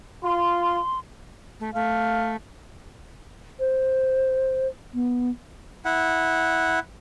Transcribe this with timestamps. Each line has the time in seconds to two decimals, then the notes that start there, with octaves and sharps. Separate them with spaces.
0.24 F4 C6
1.60 A3
1.75 A3 F5
3.59 C5
4.94 B3
5.85 E4 F#5